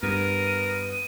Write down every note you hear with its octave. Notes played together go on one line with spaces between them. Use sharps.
G2 B3 A#4 D#7